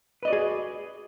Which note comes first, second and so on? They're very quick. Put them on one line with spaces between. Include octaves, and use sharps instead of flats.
B4 D#5 D5 F#4 G#4